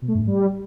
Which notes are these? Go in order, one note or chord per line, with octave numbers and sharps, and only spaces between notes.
B2
A3
G2
G#2
G3